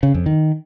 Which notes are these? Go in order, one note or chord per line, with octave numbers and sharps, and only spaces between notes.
C#3
F2
D#3